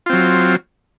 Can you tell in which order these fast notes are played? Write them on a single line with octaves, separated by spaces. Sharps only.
F4 C4 F#3